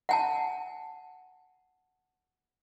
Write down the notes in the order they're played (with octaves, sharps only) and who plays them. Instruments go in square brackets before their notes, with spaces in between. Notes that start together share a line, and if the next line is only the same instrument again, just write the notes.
[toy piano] F#5 G#5 A5